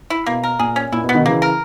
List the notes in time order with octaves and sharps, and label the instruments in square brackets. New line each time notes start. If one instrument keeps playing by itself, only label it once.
[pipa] E4
[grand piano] B2 [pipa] A#3
[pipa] A#4
[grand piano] A#2 [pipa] G#4
[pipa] C#4
[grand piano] A#2 [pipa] E4
[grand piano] B2
[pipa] B3
[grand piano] B2 D#3
[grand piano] C#3 E3 [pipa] A#3
[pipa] A#4